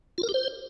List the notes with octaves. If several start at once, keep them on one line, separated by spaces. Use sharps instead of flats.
F4
A#4
G4
C5